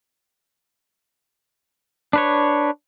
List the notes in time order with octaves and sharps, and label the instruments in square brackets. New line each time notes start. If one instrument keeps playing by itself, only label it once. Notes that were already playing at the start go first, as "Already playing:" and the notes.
[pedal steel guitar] D4 B4 C#5